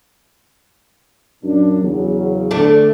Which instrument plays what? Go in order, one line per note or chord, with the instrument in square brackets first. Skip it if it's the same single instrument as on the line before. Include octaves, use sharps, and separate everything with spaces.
[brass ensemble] F#2 A#2 D4
E2 C#3 F#3
[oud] D2 A3 D4